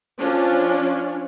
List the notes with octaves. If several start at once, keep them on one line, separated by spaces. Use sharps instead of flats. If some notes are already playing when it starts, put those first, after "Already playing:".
F3 C#4 D4